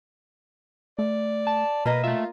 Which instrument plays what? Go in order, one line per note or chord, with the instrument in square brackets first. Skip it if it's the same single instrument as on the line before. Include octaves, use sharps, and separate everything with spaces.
[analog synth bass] A3 [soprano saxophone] D5
[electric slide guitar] A5
[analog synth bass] B2 [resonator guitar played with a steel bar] A#3 D#5 [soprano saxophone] B4
[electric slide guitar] A3 E5 [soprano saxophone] F4